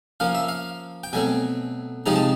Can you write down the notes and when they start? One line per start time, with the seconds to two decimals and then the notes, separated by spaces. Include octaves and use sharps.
0.20 F3 A#3 C#4 F5
0.35 E5
0.48 F5
1.04 G5
1.13 B2 F#3 A3 C4 G#5
2.06 C3 F3 G#3 C4 D#4 A#5
2.16 A5